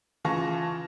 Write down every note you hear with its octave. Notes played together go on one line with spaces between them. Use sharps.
C#3 E3 F4 A5 C#6 A#6